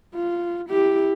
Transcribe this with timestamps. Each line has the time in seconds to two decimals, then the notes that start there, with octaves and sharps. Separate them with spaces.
0.15 F4
0.70 E4 G4